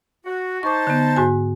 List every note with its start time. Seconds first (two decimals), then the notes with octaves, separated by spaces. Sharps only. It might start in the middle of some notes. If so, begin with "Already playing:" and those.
0.25 F#4
0.63 D#4 C5 A5 C#6 D6
0.87 D3 B3
1.16 G#2 F#4 G#5